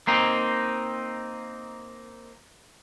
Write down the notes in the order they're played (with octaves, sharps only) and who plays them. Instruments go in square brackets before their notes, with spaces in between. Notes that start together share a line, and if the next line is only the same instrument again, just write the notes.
[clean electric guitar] A#3 C4 D#4